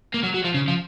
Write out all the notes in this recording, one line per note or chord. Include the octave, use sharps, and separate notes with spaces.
A#3
F#3
F#3
F3
C#3
F3